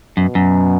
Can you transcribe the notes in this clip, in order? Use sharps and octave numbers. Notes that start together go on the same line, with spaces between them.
F#2 B2
F#2